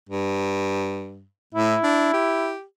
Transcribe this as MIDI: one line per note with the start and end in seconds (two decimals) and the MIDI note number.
0.10 1.25 43
1.55 1.76 45
1.55 2.54 64
1.84 2.10 62
2.14 2.63 67